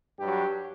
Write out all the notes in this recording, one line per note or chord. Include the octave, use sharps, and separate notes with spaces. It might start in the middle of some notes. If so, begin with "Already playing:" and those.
G2 F#3 G4